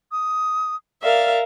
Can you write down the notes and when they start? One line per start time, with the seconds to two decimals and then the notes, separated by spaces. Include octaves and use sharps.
0.12 D#6
1.03 A#4 D5 E5 F5